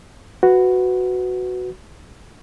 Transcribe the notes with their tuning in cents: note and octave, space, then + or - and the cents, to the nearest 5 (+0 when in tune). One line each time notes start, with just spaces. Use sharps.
F#4 +0 B4 +10